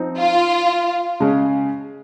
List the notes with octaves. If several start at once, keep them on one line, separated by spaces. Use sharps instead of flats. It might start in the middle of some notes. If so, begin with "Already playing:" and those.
Already playing: F3 C4 D#4
F4
C#3 G#3 C#4